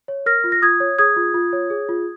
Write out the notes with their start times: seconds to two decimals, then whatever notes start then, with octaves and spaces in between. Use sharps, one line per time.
0.08 C#5
0.26 A#4 F6 A#6
0.44 F4
0.52 A#6
0.62 F4 D#6 G#6
0.80 C#5
0.99 G#4 D#6 G#6
1.16 F4
1.34 F4
1.53 C#5
1.70 G#4
1.89 F4